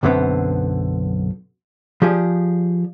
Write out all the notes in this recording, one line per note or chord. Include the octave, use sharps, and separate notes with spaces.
B1 F#2 D3 B3 C4
F3 G4 G#4 D5